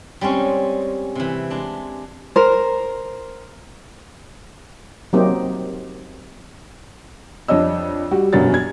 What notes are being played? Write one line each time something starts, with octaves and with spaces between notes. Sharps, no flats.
G3 G#3 C4 C#4 D#4
C3 E3
G#3 D4
A#4 C5
F#3 A#3 C4 D#4 G4
F2 D4 C#5 D#5 E6
G3 F#4
E1 A#1 F#2 B2 F#3 A6
G#6